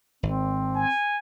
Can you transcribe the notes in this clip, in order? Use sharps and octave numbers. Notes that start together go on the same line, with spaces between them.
G#1 C4
G#5